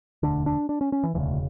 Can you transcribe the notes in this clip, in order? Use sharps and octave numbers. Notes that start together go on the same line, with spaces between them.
E1 D2 D3 D4
D4
D4
C#4
C#4
E3
E1 D2 C#3 E3